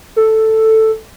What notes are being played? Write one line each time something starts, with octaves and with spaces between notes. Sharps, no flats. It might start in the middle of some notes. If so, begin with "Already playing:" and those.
A4